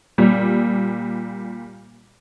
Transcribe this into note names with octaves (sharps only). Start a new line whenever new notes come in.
A#2 G3